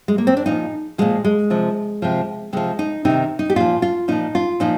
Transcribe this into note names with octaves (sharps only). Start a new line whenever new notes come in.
G#3
A#3
C4
D4
A#2 F3 D#4
A#2 F3 G#3
G#3
C3 F3
C3 F3
C3 F3 G#3
D#4
C3 D#3 D#4
D#4
G4
A#2 F3 F4
F4
A#2 F3 D#4
F4
A#2 F3 D#4